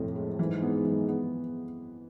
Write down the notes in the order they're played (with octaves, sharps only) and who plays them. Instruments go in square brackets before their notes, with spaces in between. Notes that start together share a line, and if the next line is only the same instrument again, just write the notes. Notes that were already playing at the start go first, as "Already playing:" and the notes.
Already playing: [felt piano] F2 C3 F3 [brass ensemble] A2
[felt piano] G#3
[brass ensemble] G#2 [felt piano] E3
[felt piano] B3
E3
B3